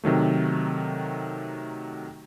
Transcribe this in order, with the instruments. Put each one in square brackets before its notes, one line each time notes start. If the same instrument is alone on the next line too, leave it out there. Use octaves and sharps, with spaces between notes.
[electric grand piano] C3 D#3 F#3 A3